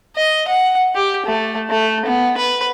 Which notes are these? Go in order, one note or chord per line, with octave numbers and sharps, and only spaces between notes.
D#5
F#5
G4
A3
A3
B3
B4